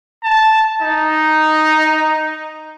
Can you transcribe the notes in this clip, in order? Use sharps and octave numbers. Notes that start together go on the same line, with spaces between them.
A5
D#4